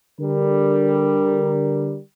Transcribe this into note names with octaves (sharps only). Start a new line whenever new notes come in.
D3 G3 A#4